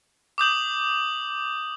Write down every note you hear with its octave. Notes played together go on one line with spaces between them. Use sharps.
D6 D#6 G6 F#7